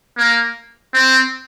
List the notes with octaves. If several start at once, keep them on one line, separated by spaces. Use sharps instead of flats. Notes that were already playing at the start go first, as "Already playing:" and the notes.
A#3
C4